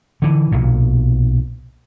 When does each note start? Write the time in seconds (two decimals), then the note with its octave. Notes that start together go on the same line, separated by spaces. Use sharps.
0.22 D3 E3
0.52 B1 A#2